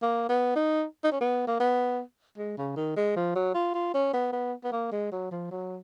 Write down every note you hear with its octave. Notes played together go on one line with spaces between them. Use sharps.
A#3
B3
D#4
D#4
C#4
B3
A#3
B3
G#3
C#3
D#3
G#3
F3
F#3
F4
F4
C#4
B3
B3
B3
A#3
G#3
F#3
F3
F#3